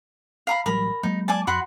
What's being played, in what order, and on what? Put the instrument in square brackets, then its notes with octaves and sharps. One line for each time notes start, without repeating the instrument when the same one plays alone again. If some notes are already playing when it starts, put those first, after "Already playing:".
[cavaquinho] F5 A#5 B5
[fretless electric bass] A1 F#3 G3 [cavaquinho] A#4 B5
[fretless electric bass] F#3 G#3 A#3 [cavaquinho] D#4
[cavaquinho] D5 G#5 A5
[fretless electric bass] F2 [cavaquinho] F#4 B5 C6